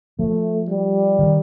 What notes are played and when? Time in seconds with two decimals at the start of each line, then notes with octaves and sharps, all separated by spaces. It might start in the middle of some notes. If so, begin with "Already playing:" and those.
0.19 F3 A3
0.69 G3
1.19 D#3